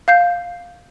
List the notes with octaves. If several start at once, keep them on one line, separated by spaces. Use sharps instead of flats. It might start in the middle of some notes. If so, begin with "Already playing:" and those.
F5 G6 C7